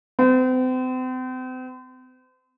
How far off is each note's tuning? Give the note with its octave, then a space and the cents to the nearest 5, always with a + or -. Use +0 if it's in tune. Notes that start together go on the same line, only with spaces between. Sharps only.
C4 -40